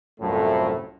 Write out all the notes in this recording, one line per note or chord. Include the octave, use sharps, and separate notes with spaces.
C2 F#2 A2 F3 A3